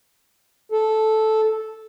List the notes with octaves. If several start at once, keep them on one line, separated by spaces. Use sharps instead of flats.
A4